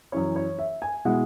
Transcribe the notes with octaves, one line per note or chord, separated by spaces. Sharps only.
F#2 E3 C#4 C#5
C#5
E5
G#5
B2 G#3 E4 F#5